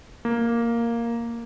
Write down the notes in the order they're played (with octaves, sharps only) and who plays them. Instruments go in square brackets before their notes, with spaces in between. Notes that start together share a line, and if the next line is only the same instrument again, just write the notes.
[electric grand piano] A#3